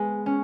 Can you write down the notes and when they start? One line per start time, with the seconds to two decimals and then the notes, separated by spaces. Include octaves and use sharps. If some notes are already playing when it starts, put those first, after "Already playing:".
Already playing: G#3 B3
0.26 C#4